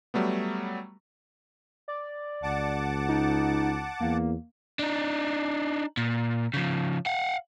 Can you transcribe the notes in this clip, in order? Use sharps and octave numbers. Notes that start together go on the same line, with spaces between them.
F#3 G3 A3 B3
D5
C#2 F#5 A5 D6
D#4
E2 A#3
D4 D#4
A#2
C#3 F3
F5 F#5